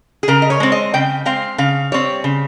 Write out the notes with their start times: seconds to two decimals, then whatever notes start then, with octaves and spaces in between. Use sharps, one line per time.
0.23 G#4
0.28 C#3 A#4
0.42 D#5
0.50 C#5
0.60 G#3 C4
0.72 D#5
0.94 C#3 G5
1.26 G#3 C4 F5
1.58 C#3 F5
1.92 G3 C4 C#5
2.24 C#3